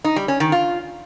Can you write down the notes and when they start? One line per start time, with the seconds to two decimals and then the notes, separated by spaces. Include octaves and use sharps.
0.04 D#4
0.16 G3
0.28 C#4
0.40 D#3
0.52 F4